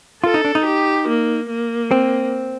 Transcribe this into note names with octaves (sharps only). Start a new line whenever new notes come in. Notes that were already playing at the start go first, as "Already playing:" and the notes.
F4 A4
D#4
D4
D#4
G4
A#3
A#3
C4